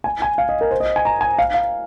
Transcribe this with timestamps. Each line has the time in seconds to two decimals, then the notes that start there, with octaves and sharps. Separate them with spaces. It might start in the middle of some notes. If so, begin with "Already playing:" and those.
0.04 G#5
0.22 G#5
0.38 F5
0.49 D#5
0.61 A#4
0.71 C5
0.80 D#5
0.96 G#5
1.05 A#5
1.21 G#5
1.39 F5
1.54 F5